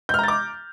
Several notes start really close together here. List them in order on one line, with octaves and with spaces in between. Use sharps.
G6 F6 A#5 A6 D6